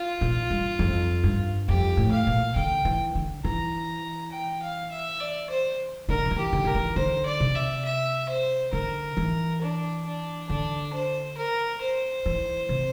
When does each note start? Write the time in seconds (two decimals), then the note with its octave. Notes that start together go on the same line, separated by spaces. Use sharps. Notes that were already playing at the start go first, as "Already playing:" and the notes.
Already playing: F4
0.21 A#2
0.50 G2
0.79 F2
1.24 G2
1.68 F2 G4
1.97 A2
2.12 F5
2.27 A#2
2.56 D3 G5
2.85 E3
3.15 D3
3.44 E3 A#5
4.32 G5
4.62 F5
4.91 E5
5.20 D5
5.50 C5
6.09 D3 A#4
6.25 D3
6.31 E3
6.38 G4
6.53 D3
6.64 D3 A#4
6.75 E3
6.96 D3 C5
7.25 D5
7.40 C3
7.55 E5
7.85 E5
8.29 C5
8.73 D3 A#4
9.17 E3
9.61 D4
10.05 D4
10.49 D3 D4
10.93 C5
11.37 A#4
11.81 C5
12.26 E3
12.69 C3